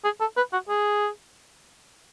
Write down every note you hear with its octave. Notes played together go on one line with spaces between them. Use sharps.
G#4
A4
B4
F#4
G#4